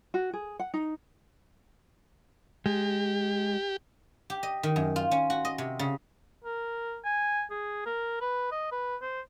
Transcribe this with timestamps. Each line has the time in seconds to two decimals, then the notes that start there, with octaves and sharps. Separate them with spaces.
0.14 F#4
0.33 G#4
0.59 F#5
0.74 D#4
2.66 G#3 G4
4.30 G4
4.43 D#5
4.63 D#3
4.76 F#2
4.96 F4
5.11 C#4
5.30 F#4
5.45 D#5
5.58 C3
5.79 C#3
6.44 A#4
7.04 G#5
7.50 G#4
7.86 A#4
8.21 B4
8.51 D#5
8.71 B4
9.02 C5